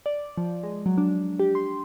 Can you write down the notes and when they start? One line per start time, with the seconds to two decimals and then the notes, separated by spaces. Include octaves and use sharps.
0.06 D5
0.37 F3
0.63 G#3
0.86 F#3
0.98 D4
1.40 G4
1.55 C6